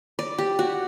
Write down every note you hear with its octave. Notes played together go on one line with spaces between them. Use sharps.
D5
G4
F#4